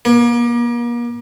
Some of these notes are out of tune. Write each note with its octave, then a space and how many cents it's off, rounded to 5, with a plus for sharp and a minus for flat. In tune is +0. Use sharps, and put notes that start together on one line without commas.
A#3 +40